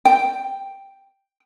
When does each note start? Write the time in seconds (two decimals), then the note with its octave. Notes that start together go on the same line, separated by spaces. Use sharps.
0.05 G5